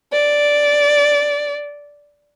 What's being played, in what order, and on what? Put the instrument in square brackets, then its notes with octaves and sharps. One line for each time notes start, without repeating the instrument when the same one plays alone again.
[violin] D5